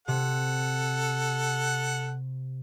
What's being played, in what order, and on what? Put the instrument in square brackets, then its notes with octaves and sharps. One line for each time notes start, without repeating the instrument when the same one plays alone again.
[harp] C3 [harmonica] A4 F#5